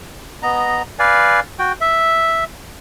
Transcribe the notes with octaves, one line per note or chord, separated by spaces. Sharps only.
B3 D#5 A#5
B4 D5 F5 G#5
F#4 G5
E5